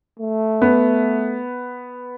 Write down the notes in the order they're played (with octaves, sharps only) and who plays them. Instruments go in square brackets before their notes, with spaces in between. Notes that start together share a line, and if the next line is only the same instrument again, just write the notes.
[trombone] A3
[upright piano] B3